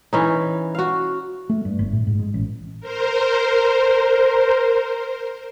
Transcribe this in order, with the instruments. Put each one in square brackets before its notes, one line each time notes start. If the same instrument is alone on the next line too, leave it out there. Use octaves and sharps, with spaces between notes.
[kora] E3 C#4 D#4
F#4 F5
[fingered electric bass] A3
G2
G1
A2
G#2
G#3
A1
[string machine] A#4 C5